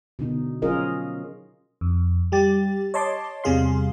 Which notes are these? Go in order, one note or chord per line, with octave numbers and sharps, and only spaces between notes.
B2 D3 D#4
F#3 C#4 F4 G#4 A#4 D#5
F2
G3 G4 A6
C#5 D#5 A5 C6 D6
E2 C3 G3 G#4 F5 C6